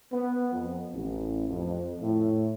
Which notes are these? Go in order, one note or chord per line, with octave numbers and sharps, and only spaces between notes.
B3
F2
A1
F2
A2